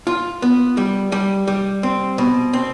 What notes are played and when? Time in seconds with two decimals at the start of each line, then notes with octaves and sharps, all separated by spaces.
0.07 F4
0.42 B3
0.77 G3
1.12 G3
1.48 G3
1.83 C4
2.18 B2
2.53 C4